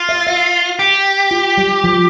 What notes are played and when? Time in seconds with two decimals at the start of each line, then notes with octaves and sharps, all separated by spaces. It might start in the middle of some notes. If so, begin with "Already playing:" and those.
Already playing: F4
0.09 E5
0.27 E5
0.79 G4
1.31 F4
1.58 G3
1.84 F3